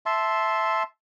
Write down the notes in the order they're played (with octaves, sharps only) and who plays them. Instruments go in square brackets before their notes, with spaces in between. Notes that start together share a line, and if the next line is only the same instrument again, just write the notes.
[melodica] E5 A5 C6